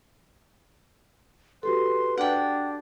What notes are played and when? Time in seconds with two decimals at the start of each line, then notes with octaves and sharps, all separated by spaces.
1.63 F#4 G4 A4 B4 C6
2.18 D4 F#5 G5